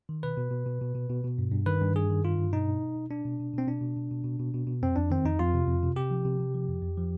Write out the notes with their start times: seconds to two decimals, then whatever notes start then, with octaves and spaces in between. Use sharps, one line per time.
0.09 D#3
0.23 B2 B4
0.37 B2
0.51 B2
0.66 B2
0.81 B2
0.95 B2
1.10 B2
1.24 B2
1.38 G2
1.52 G2
1.66 D#3 B4
1.81 G2
1.95 G2 G#4
2.10 D#3
2.24 G2 F4
2.39 G2
2.53 B2 D#4
2.68 B2
2.82 B2
2.96 B2
3.10 B2 D4
3.25 B2
3.39 B2
3.54 B2 C4
3.67 B2 D4
3.81 B2
3.97 B2
4.11 B2
4.24 B2
4.39 B2
4.54 B2
4.67 B2
4.82 F2 C4
4.96 F2 D4
5.10 D#3 C4
5.25 F2 D#4
5.39 F2 F4
5.54 C3
5.68 F2
5.83 C3
5.96 C3 G4
6.11 F3
6.25 C3
6.39 C3
6.54 F3
6.68 F2
6.82 F2
6.97 F3